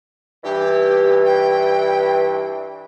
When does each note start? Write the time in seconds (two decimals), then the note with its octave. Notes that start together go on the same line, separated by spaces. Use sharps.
0.44 G2 E3 G4
1.26 G5